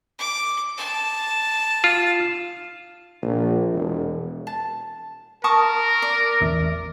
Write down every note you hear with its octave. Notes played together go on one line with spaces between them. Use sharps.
D6
A5
F4
A#1
E1
A5
A#4 A5 C#6 D#6
D5
A1 E2 E5